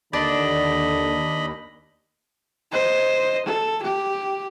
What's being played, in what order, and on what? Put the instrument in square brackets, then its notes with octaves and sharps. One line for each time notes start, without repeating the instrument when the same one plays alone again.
[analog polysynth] D#2 [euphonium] D3 [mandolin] D4 D5 A5 [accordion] D#5 B5
[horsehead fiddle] C5 D#5
A4
G4